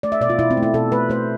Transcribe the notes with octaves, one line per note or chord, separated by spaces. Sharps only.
A3 D5
E5
B2 D5
F4
B2 E4
C4
A3
E4
B2 A4
A3 B4
A3 C5